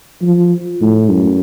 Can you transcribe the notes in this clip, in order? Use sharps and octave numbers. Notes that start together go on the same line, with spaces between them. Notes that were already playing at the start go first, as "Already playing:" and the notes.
F3
A2
F#2